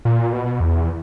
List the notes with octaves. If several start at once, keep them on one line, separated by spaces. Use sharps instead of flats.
A#2
B2
E2